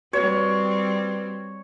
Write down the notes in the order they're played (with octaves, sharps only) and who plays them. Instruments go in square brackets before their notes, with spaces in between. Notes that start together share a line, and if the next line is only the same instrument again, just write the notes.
[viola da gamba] G3 C4 [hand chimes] F#4 B4 [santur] C#5